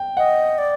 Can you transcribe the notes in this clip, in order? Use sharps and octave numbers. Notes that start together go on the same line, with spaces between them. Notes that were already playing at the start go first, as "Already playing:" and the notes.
Already playing: G5
D#5 F#5
D5